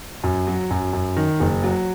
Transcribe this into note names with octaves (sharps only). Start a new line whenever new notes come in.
F#2
F#3
F#2
F#2
D#3
F#1
F#3